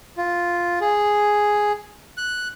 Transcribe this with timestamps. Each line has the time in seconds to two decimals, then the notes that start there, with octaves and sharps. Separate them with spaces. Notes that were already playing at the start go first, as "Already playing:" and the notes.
0.17 F4
0.81 G#4
2.17 F#6